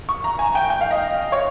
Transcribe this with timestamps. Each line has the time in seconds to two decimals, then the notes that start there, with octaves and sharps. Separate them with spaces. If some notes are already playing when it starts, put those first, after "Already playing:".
0.09 C#6
0.24 A#5
0.39 G#5
0.55 G5
0.70 G5
0.81 F5
0.91 D#5
1.32 C#5